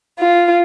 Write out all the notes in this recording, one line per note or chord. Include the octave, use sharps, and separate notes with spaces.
F4